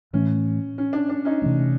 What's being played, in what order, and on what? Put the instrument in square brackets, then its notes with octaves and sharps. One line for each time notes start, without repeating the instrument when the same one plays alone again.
[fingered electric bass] A2 E3 A3 [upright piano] C#4
[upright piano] C#4
D4
D4
C#4 D#4
[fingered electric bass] C3 E3 A3